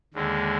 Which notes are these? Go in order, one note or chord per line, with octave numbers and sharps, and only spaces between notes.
D#2 D3 G#3